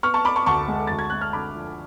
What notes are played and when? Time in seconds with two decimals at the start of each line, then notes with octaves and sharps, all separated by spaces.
0.03 B3 C#6 F6
0.14 A5 C#6
0.25 B3 B5 D6
0.36 A5 C#6
0.46 D2 A5 C#6
0.68 G#3
0.87 D2 A6
0.99 G#6
1.10 G#3 F#6
1.21 F6
1.33 D3 B5 D6
1.55 F3